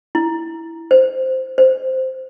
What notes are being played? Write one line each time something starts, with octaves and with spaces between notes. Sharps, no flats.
E4
C5
C5